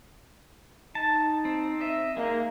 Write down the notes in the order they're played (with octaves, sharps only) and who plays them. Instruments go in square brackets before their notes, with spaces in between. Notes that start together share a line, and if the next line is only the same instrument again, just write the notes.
[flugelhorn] D#4 [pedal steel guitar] A5
[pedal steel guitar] C4
D#5 E5
[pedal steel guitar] G#3 D#4 [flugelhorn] A#3